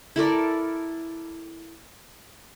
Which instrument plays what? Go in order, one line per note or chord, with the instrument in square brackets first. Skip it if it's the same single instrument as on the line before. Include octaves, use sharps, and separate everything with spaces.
[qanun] E4 A4 A#4 D5